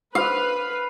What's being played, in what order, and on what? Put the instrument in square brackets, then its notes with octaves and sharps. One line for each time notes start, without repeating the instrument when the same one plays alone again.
[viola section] B4 [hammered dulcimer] F5